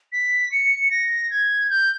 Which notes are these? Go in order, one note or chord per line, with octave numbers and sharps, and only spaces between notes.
B6
C#7
A#6
G#6
G6